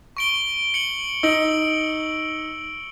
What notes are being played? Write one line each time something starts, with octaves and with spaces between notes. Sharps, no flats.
C#6 D7 G7
C#7 F#7
D#4 E6 D7 F#7